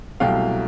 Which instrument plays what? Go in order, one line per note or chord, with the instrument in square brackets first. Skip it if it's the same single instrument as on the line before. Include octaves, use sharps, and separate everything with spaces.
[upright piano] C2 B2 F#3 A3 F5 G5